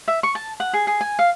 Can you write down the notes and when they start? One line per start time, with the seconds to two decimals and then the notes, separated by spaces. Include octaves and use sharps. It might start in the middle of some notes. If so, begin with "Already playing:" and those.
0.08 E5
0.23 C#6
0.35 A5
0.60 F#5
0.73 G#4
0.87 G#4
1.01 G#5
1.19 F5